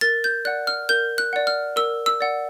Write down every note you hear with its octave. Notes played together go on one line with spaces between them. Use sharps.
A#4 A6
G6
D5 F#5 F#6
F6
A#4 G6
F#6
D5 F#5
F6
A#4 E6
E6
D5 F#5